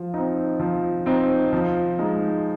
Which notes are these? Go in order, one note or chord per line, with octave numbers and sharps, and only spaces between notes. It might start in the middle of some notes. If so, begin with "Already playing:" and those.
Already playing: F3
C4 D#4
F3
C4 D#4
F3
G#3 D#4